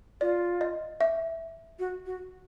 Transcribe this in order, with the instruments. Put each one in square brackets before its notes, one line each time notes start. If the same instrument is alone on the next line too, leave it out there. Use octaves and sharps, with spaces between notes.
[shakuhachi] F4 [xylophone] D5
[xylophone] D#5
E5
[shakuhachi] F#4
F#4